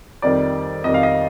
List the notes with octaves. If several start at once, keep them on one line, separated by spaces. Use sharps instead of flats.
F2 D#3 G3 D5
F2 D#3 G3 D#5
F5
D#5